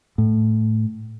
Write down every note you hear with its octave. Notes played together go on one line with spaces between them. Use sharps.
A2